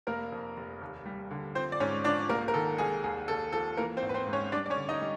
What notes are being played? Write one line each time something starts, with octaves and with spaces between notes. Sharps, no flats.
F1 A#3 A#4
F2
F1
D#2
G3
D3
F3 C4 C5
D5
G#2 C#4 C#5
F3 D4 D5
C2 A#3 A#4
A#4
D#3 A4
C2 G#4
D#2 G#4
D#2 A4
F3 A4
E3 A#3 A#4
C4 C5
G#1
B4
C4 C5
G#2
C#4 C#5
G3 D4 D5
D5
C#4 C#5
D3
D#4 D#5
G3